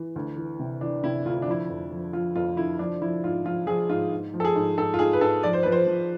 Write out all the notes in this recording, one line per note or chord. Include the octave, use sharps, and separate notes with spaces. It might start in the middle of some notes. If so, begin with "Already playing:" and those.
Already playing: E3
D2
E3
C3
E3 D4
C3 E4
D2 F4
E4
D4
F3 E4
F2
F3
F3 F4
F2 F4
D3 E4
F3 D4
F3 E4
G#2 F4
F3 F4
F3 G#4
G#2 F4
G#2
F3
A4
G#4
G#2
G#2 A4
F4
G#2 G#4
B4
G#2 A4
F3 D5
C5
F3 B4
C5
F3